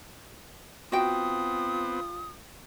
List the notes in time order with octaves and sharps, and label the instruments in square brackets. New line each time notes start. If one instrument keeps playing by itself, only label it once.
[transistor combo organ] B3 C4 [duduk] F4 [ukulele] F#4 G5 [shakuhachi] D#6